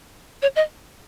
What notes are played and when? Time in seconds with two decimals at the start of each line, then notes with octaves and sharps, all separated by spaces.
0.42 C#5
0.56 D#5